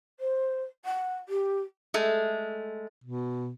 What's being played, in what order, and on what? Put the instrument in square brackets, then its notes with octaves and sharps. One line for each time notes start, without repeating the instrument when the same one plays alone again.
[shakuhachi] C5
F#5
G4
[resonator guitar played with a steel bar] G#3 A3
[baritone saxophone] B2